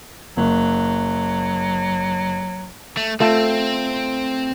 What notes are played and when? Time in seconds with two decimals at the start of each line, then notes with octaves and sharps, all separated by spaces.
0.37 F#1 F#3
2.97 A3
3.20 A3 C4 F4 A4